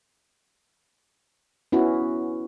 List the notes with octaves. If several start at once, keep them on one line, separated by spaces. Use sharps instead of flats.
B3 C#4 E4 F#4